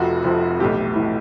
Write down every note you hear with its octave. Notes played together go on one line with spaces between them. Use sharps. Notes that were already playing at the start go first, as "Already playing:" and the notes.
Already playing: F1 F2 C3 F3 F#4
F1 F2 C3 F3
B1 A2 E3 G4
A2 E3